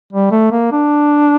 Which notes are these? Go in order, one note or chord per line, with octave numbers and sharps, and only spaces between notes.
G3
A3
A#3
D4